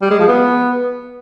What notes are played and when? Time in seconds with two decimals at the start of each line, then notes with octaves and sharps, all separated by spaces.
0.02 G3
0.11 G#3
0.19 F3
0.28 B3